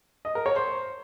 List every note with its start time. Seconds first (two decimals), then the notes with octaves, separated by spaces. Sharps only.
0.25 D#5
0.35 A#4
0.46 C#5
0.56 C5